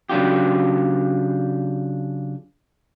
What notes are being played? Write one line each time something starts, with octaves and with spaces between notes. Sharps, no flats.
C#3 F#3 D4 F4 G4